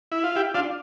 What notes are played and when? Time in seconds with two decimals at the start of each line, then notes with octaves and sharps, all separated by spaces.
0.12 E4
0.24 F4
0.36 E4 G4
0.54 D4 F4